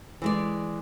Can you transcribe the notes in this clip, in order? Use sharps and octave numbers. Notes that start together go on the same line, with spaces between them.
E3 G#3 D5